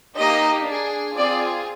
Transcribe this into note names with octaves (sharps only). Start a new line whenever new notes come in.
A#3 D#4 G4 D#5
D4 G#4
C4 F4 G#4 D5